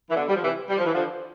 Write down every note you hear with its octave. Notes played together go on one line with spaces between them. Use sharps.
E3
B2 D3
G3
F3
C3 E3
G3
F3
E3
D3 F3